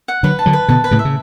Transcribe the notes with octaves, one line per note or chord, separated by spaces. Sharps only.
F#5
D3 F#3 B4
A5
D3 F#3
B4
B2 D3 A5
B4
A2 C#3
E5
C#3